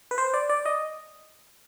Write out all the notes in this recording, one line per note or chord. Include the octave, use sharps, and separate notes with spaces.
B4
C5
D5
D5
D#5